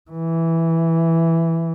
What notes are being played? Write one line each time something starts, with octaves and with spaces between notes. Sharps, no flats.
E3